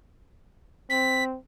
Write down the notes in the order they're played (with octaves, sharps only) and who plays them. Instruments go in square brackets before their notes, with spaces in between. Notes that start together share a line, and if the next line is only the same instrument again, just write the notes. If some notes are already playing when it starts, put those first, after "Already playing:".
[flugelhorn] C4 [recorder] B6